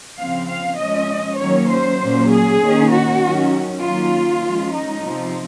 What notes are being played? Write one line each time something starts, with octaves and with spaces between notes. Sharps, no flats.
C#3 F3 C4 F5
F5
F3 G#3 C#4 D#5
D#3 F#3 A#3 C#4 C#5
C5
A#2 F#3 A#3 C#4
G#4
D#3 A#3 C#4
F#4
D#3 F#3 C#4
D#3 F#3 A#3 C#4 F4
F3 G#3 C#4
D#4
C3 F3 C4